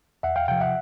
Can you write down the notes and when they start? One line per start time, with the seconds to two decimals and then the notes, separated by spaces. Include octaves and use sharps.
0.23 E2 E5 F#5
0.36 F5 G5
0.48 C3 F3 F5 G5
0.61 E5 F#5